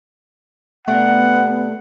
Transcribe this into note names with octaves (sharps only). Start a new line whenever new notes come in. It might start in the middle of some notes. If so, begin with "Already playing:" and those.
C3 A3 B3 D4 A#4 F#5